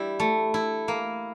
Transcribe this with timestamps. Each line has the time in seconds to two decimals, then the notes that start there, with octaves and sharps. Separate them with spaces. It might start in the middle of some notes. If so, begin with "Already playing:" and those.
Already playing: G3 E4
0.20 A3
0.54 E4
0.88 A#3